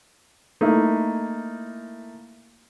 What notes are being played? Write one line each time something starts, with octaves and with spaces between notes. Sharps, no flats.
A3 A#3 D#4 E4